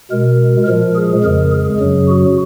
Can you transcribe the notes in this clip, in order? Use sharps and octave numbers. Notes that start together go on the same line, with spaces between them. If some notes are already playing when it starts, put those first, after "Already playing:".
B2 G#3 A#4
A#2 F3 G#3 A#4
G#4
F2 C#3 G#3 A#4
G#4
F#2 C#3 F#3
F#4